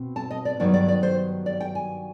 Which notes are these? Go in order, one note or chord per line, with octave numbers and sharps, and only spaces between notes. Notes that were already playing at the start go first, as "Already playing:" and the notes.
Already playing: B2 C4
A5
D#5
D5
G2 D#3 F#3 B3 D#4 D5
D5
D5
C5
D5
G5
G#5